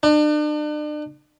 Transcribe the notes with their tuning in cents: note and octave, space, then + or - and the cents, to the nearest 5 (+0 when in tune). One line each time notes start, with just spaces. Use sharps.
D4 +40